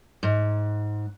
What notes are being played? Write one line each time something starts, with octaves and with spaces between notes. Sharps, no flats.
G#2